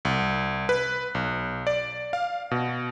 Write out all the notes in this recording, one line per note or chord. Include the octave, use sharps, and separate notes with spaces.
C2
B4
B1
D5
F5
B2